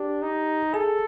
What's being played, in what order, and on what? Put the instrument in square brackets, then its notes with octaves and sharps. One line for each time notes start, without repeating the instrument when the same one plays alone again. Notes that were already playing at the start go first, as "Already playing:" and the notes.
Already playing: [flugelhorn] D4 [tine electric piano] G4
[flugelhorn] D#4
[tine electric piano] G#4 [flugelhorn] A4